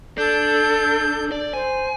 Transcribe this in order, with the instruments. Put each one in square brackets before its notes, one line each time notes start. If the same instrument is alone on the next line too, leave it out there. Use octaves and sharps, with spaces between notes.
[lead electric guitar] D4 [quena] A4 [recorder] G6
[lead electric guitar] D5
[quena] C5 [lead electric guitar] G#5